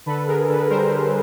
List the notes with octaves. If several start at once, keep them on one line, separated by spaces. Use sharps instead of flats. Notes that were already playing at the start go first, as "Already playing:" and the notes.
D3 A4 B4
D3 G#4 A#4
D3 A4 B4
G3 A#4 C5